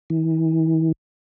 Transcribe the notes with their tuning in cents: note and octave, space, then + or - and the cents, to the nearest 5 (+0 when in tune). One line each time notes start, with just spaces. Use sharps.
E3 -40